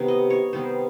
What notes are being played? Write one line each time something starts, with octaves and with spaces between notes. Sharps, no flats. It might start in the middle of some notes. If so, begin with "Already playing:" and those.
Already playing: C3 D#3 G3 B3
D#5
C#5
C3 D#3 G3 B3 C5